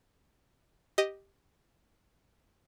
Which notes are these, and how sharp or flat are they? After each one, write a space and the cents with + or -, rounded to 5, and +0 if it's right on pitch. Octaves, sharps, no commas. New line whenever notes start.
G4 +0 D#5 +0